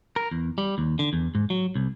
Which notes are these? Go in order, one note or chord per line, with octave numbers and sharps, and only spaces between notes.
A#4
E2
G3
D#2
D3
E2
G#2
F#3
C2